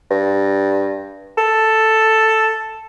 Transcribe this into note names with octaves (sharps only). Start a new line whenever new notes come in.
G2
A4